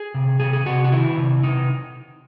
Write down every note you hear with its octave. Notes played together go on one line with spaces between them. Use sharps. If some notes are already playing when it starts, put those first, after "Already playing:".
Already playing: G#4
C3
C3 G#4
G#4
C3 F#4
F#4
D#3 E4
C3
C3 D#4